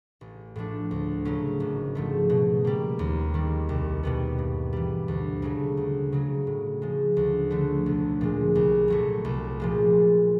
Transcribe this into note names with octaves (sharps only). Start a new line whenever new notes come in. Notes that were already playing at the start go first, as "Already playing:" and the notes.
A1
A2 F3 A3 D4
D2
C#3 F#3 A3 C#4
G#1
G#2 F3 A3
B2
G3 A#3
D#2
D#3 G3
C2
B2 G3 B3
G2
E3 G3
D2
C#3 F#3 A3
D2
C#3 F#3
A2
F3 G#3
D2
D3 F3 A3
B1
A#2 F3 G#3
C2
A#2 F#3 A3
C2
A#2 F3 G#3